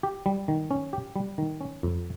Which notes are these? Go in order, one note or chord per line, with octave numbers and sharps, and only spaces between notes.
G4
G3
D#3
C#4
G4
G3
D#3
C#4
F2